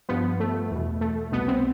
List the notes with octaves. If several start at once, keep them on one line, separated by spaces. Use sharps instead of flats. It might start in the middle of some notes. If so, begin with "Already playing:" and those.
G2 F3 B3
A3
E2 B2
A3
C2 B2 B3
C4